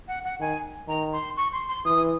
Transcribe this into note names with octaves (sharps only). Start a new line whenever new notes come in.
F#5
F#5
D#3 G#5
D#3 A#5
C6
C#6
C6
C6
E3 D#6